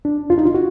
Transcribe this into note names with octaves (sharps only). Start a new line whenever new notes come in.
D4
F4
D#4
F4
F#4